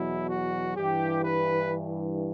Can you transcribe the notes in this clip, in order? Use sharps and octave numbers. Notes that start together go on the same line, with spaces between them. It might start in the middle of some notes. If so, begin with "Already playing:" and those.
Already playing: E2 B2 F#3 E4
F#4
G2 E3 G4
B4